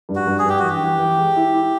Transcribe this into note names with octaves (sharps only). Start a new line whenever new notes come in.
G2
F#4
G2
G#4
G2 G4
E3 F#4
G4
E3
E3
G#3
E4
E4